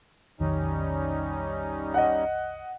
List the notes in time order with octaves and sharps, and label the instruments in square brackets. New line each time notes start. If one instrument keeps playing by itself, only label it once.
[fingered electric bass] B1 F2 D#3 [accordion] G3 C#4 D#4
[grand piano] D#5 F#5